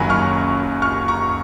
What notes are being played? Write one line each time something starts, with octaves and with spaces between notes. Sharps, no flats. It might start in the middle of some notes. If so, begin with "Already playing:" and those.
Already playing: F#1 F#2 D#3 F#3 G#5 A#5 B5
C#6 F6
C#6 F6
A#5 C#6